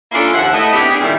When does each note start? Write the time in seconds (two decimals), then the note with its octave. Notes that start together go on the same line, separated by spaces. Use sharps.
0.12 A#3 C#4 D4 E4 F4 A4
0.34 D#2 F3 E5 F#5
0.52 A3 E4 D#5
0.73 B3 C4 D4 E4 G4
0.89 B3 C4 D4 G#4
1.00 A#2 D#3 G3 E4